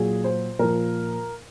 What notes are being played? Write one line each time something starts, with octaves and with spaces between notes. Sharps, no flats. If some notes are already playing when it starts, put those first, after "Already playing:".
Already playing: A#2 F#3 G#4
C5
A#2 F3 A#4